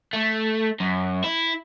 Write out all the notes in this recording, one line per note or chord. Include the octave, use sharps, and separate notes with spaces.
A3
F#2
E4